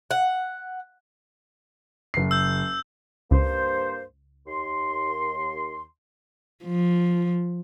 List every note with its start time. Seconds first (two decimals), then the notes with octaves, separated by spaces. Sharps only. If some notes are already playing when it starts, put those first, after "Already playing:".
0.11 F#5
2.14 F#1 C7
2.31 E6 G6
3.31 C#2 G2 A#3 C5
4.47 D#2 C6
6.65 F3